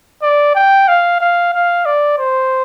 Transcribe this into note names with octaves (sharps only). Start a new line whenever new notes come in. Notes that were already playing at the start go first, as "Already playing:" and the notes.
D5
G5
F5
F5
F5
D5
C5